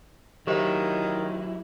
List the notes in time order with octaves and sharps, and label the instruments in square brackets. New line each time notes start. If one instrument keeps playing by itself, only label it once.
[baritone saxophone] D#3 [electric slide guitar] F#3 E4 [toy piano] G4 C5 D#5